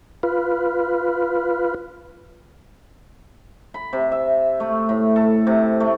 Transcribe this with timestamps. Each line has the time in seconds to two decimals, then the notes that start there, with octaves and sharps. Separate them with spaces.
0.23 F4 B4
3.74 B5
3.93 C3
4.12 E5
4.60 A3
4.89 A2
5.16 A4
5.47 C3
5.80 A3